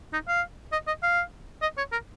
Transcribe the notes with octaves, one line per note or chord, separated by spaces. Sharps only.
D#4
F5
D#5
D#5
F5
D#5
C#5
A#4